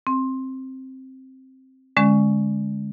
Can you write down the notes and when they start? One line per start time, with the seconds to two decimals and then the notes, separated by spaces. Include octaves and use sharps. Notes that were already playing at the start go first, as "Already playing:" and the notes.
0.07 C4
1.97 D3 G#3 C#4